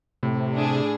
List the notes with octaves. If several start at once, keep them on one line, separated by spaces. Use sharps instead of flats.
A2 C3
D4 G#4